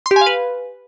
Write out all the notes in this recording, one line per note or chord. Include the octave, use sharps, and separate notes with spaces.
C6
G4
G#5
F5
B4